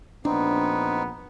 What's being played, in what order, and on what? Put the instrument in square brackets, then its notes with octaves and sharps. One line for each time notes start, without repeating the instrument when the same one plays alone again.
[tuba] A#1 [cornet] B3 [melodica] C4 D#4 [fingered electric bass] D4